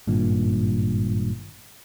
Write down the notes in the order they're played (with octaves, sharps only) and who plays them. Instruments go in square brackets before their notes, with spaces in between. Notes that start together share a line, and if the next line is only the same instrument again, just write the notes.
[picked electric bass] G#1 G2 A#2